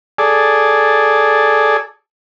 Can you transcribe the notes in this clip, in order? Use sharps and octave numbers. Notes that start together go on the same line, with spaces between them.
G#4 A4 D5